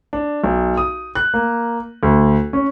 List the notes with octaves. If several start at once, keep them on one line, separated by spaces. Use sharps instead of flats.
D4
B1
D#6
F#6
A#3
D2
C#4